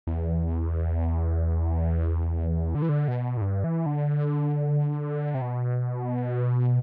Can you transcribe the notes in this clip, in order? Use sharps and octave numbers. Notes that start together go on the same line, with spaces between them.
E2
D3
E3
D3
B2
A2
G2
E3
D3
C3
B2